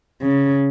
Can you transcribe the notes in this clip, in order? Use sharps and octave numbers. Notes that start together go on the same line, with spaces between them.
C#3